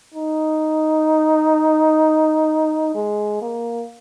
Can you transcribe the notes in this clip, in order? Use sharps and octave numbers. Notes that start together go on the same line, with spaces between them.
D#4
G#3
A#3